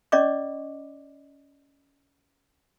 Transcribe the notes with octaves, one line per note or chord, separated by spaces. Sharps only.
C#4 D5 D#5 C#6 D6